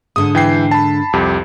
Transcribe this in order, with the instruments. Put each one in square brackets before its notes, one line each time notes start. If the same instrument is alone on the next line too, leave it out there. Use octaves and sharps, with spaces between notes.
[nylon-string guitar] G#2 D3 [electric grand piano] D#6
[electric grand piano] E3 G5 C7
A5 B5
C2 F2 G4